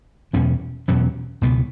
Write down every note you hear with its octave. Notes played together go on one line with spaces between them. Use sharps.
E2 B2 F#3 C#4
E2 B2 F#3 C#4
C#2 B2 B3